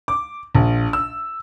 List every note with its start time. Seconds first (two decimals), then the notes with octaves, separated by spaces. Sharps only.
0.08 D6
0.55 A#1
0.93 E6